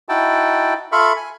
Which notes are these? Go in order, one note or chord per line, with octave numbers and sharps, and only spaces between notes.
D#4 E4 F#4 G5 A5
F4 A4 E5 F5 B5 C#6
G#5